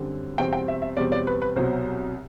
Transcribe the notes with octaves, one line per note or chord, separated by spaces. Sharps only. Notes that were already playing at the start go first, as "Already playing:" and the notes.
Already playing: F#2 D3 G3 C4
E2 B2 G3 C4 G5
G5
E5
E5
E2 B2 G3 C4 D5
D5
B4
B4
C2 B2 F#3 C5